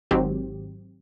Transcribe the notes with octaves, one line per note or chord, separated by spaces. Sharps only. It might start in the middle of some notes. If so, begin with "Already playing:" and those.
G#1 G#2 D#3 F#3 C4 G4